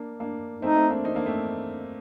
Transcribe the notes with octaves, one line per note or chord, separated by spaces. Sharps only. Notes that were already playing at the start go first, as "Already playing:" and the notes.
Already playing: A#3 D4
A#3 D4
A3 C4 D#4
A3 C4
A#3 D4
C4 D#4
A#3 D4
A3 C4